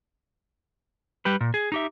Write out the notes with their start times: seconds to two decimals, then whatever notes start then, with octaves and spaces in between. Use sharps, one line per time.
1.25 G3 G4 B4
1.41 A#2
1.54 G#4
1.72 D#4 G4 E5